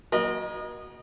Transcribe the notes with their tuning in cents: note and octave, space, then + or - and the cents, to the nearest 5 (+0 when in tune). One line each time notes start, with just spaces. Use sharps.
F#3 +0 A#4 +35 D#5 -20